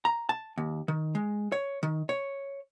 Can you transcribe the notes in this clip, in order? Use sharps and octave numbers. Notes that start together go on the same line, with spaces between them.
A#5
A5
D#2
D#3
G#3
C#5
D#3
C#5